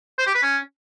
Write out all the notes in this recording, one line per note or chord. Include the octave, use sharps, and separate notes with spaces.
C5
G4
B4
C#4